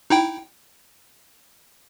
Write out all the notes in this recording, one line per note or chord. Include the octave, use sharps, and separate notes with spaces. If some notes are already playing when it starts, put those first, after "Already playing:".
D#4 E4 G5